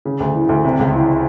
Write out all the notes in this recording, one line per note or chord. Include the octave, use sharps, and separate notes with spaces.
C#3
D2
E3
D2
C3
C#2
E3